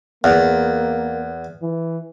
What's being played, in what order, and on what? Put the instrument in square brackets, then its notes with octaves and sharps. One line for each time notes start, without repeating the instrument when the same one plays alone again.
[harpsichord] E2 [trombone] A#3
[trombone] E3